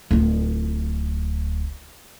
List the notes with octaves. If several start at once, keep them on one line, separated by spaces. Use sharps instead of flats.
D1 F4